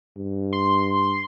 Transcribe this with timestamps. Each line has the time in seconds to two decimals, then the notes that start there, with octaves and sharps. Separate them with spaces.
0.17 G2
0.53 C6